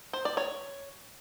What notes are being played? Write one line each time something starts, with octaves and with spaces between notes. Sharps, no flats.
C5
D5
C#5